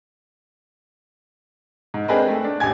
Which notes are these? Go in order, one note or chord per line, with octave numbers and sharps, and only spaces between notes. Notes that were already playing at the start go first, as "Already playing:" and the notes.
G#2
C4 D4 G#4 A#4 B4 D#5
A3
D4
A1 G4 G#5 G#6